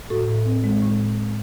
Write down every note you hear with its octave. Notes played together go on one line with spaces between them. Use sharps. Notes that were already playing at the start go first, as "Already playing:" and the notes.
A2 F#4 A4
A2
C4
G#3
A2